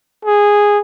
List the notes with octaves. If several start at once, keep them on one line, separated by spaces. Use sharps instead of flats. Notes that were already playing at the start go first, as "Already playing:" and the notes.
G#4